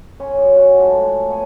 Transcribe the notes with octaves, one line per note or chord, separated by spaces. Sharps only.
C#4 C#5 G#5 C6
F#2
C#4 F#4
G#2 F3 A4 A5
A3
B3 C#5 G#5 C#6